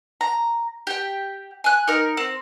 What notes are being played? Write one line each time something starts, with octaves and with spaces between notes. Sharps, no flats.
A#5
G4 G5
G#5 F#6
D#4 A#4
C4